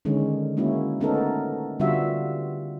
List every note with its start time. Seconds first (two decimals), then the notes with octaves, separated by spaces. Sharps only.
0.05 D3 D#3 G#3 C#4
0.57 G#3 A#3 C#4 E4 F#4
1.01 A3 B3 C#4 D#4 A4 A#4
1.80 D3 G3 B3 F4 F#4 E5